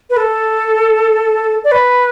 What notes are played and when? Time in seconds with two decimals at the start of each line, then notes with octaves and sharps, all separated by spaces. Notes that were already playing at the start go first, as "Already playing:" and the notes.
0.09 B4
0.16 A4
1.63 D5
1.71 B4